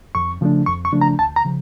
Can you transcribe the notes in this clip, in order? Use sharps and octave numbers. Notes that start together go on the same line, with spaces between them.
F2 C#6
C#3 F3 A3 D4
F2 C#6
C#6
C#3 F3 A3 D4
A#5
D2 A5
A#5
C#3 F3